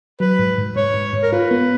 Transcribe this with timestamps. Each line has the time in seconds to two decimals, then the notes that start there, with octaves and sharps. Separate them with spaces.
0.20 F#3 B4
0.39 G#2
0.58 G#2
0.76 G#2 C#5
0.94 G#2
1.13 G#2
1.23 A#4
1.32 F4 B4
1.51 B3